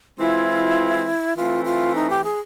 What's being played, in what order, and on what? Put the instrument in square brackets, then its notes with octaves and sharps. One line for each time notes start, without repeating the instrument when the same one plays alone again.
[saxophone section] E3 G#3 C4 F4 [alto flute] E4
[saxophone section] E3 A3 C4 [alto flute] F4
[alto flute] F4
D#4
G4
G#4